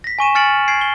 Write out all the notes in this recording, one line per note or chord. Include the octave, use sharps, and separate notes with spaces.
A#6 B6
G#5 C#6 D#7 E7
G#5 F6 A6 C#7 D7 F#7
G#6 C7 D7
G7